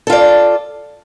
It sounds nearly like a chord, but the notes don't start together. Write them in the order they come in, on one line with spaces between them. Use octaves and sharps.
A4 F4 D5